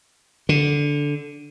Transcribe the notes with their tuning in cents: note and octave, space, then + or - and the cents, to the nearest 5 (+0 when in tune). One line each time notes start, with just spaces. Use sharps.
D3 -10